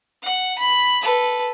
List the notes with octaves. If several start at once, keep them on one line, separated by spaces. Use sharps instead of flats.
F#5
B5
A4 B4